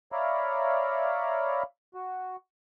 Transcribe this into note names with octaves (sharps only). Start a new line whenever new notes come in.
C#5 D5 E5 F5 A#5 B5
F#4